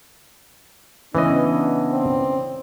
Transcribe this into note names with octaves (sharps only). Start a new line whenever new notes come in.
C#3 E3 B3 C#4 D4 D#5
C4